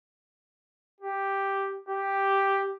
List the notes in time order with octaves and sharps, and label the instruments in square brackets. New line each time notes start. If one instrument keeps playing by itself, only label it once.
[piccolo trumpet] G4
G4